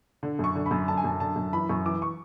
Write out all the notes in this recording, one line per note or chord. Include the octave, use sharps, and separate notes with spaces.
D3
F#2 C#6
D3
B5
F#2
D3 A5
G#5
F#2 A5
D3 A5
F#2
E3 B5
F#2 C#6
E3 D6
C#6